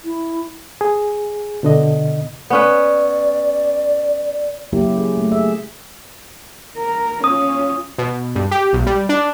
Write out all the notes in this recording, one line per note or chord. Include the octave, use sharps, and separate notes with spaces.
E4
G#4
B2 D3 D#5
B3 C#4 B4 D5
C#3 F#3 A#3 E4 G4
G#4
A3
G#4 E5
A#4
C#4 F4 D#6
B2
G2
G4
B1
G3
D4